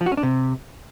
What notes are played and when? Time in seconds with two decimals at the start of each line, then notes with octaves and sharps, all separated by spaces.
0.01 F3
0.06 F#4
0.12 C#4
0.17 D4
0.23 C3